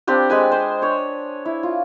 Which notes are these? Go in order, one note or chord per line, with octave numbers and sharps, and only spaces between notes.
C4 D4 G4 B4
G#3 B4 G#5
C5
D4 C#5
E4
F4